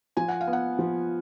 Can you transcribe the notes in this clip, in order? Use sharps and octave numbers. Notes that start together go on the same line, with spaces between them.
F3 G#5
F#5
F5
B3
F#5
F3